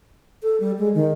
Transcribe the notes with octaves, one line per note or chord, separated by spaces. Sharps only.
A4
G3
G#3
D#3